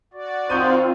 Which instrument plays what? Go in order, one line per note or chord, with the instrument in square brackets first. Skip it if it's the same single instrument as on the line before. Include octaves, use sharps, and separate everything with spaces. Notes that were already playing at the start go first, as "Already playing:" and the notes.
[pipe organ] F#4 D5
[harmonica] D#3 D#4 C5 [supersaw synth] C4 F4 [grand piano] C#6 G6 D#7